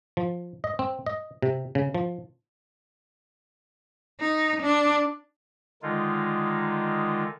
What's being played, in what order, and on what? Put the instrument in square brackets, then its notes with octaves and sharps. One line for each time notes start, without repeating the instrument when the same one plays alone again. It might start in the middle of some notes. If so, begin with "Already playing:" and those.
[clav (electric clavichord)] F3
D#5
C4
D#5
C3
C#3
F3
[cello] D#4
D4
[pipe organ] D3 D#3 G#3 D#4 F4